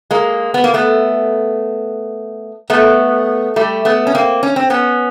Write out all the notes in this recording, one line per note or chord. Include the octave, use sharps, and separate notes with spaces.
G#3 A#3
B3
A#3
A3 B3
A3 B3
G3 A3
A3 B3
C#4
A#3 C4
C#4
C4
B3 C#4